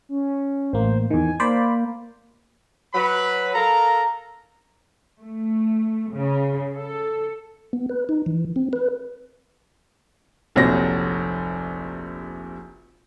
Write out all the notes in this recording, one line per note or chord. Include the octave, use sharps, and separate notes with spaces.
C#4
A1 A#3 C5
E2 D#3 G#5
A#3 C5 D5 B5
F#3 B4 B5
A4 A#4 F5 A#5
A3
C#3
A4
B3
B4
D#4
E3
C4
B4
F1 A#1 C3 F#3 A#6